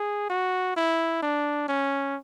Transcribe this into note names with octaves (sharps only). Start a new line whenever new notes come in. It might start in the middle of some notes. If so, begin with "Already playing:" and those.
Already playing: G#4
F#4
E4
D4
C#4